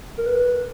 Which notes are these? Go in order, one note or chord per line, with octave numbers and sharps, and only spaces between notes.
A#4
B4